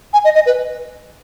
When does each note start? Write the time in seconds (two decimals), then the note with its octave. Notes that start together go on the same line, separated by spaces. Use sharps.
0.13 G#5
0.24 D#5
0.35 D#5
0.46 B4